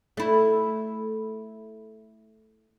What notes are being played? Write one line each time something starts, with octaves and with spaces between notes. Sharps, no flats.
A3 E4